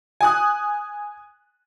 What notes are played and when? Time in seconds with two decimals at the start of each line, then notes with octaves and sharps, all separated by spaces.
0.21 G#5 D#6 F#6